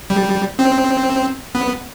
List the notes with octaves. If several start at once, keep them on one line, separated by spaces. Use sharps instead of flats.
G3
C4
B3